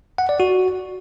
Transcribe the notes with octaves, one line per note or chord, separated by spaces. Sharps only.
F#5
D5
F#4